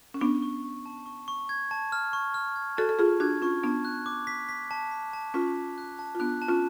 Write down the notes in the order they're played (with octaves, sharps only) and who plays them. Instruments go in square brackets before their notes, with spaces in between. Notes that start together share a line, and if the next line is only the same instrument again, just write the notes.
[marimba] C#4
[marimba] B3 D4 [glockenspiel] C#6
[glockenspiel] C#6
C#6
A5
C#6
C#6
G#6
A5
F6
C#6
F6
G#6
[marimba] F#4 A4 [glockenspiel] A5
[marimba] A4
[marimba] F4 G#4 [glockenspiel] F6
[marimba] D4 F#4 [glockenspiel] G#6
[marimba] C#4 F4 [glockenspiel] C#6
[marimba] B3 D4 [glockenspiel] A5
[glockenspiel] F#6
D6
B6
B6
A5
B6
A5
[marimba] C#4 F4 [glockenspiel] B6
[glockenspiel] A5
F#6
A5
[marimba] F4
[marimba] B3 D4 [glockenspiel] F#6
[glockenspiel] A5
[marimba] C#4 F4